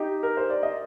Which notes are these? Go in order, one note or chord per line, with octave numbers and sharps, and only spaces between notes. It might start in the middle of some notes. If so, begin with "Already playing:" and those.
Already playing: D#4 G4
A#4
C5
D5
D#5